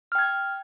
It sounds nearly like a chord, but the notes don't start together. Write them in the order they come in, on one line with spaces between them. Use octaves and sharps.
F6 G5 G#6